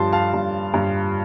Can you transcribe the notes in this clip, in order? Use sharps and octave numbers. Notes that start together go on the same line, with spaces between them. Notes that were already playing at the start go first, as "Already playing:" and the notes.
Already playing: G2 F3 A5 C6
F5 A5
G2
G2